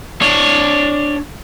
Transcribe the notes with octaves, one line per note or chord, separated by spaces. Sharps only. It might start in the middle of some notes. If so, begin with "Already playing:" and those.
D4 C#5